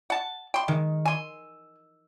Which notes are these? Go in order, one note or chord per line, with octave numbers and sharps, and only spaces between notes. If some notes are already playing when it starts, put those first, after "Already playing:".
F#5 A5
G5 C6
D#3 G#3
G#5 C6 E6 D#7